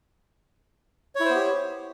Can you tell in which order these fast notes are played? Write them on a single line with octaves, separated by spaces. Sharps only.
C#5 E4 C5 B3 G4